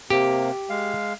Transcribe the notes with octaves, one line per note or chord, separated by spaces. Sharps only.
C3 A#3 G4
G#3 F5